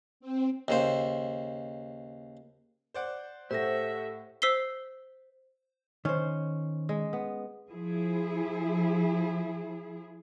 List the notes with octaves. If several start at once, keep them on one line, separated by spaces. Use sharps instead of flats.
C4
D#2 C#3 C5
C5 D5 F#5
A2 G4 A4 C5 E5 F#5 A#6
C5 E6 B6 C7 G7
D#3 C#4 C5
G#3
B3
F3 E4 G#4